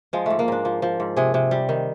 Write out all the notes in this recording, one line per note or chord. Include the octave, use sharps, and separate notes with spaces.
F3 G#3
G#2 A3
A#3
G#2 D4
F3
F3
G#2
C3 G#4
C3
G3
D#3